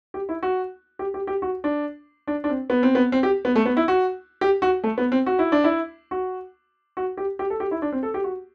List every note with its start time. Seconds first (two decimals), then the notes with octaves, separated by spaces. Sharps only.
0.14 G4
0.29 E4
0.43 F#4
0.99 G4
1.14 G4
1.27 G4
1.42 F#4
1.64 D4
2.27 D4
2.44 D4
2.49 C4
2.70 B3
2.83 C4
2.95 B3
3.12 C4
3.23 G4
3.45 B3
3.56 A3
3.66 B3
3.77 E4
3.88 F#4
4.41 G4
4.62 F#4
4.84 A3
4.98 B3
5.12 C4
5.26 F#4
5.39 E4
5.52 D4
5.64 E4
6.11 F#4
6.97 F#4
7.17 G4
7.39 G4
7.50 A4
7.60 G4
7.71 E4
7.82 D4
7.92 C4
8.03 A4
8.14 G4
8.24 F#4